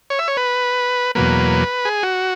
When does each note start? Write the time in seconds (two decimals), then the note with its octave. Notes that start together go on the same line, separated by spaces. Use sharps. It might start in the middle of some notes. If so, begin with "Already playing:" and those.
0.10 C#5
0.19 E5
0.28 C#5
0.37 B4
1.15 E2 B2 F#3 A#3 B4
1.85 G#4
2.03 F#4